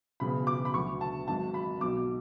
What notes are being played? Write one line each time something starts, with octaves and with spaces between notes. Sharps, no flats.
E1 E2 C#3 F#3 B5
D6
B5
D2 D3 F#3 C#6
A5
G#1 G#2 F#3 A5
B5
B1 B2 F#3 D6